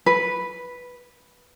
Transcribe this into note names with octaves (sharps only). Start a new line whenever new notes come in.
B4